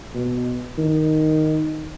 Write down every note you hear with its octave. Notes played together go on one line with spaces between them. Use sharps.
B2
D#3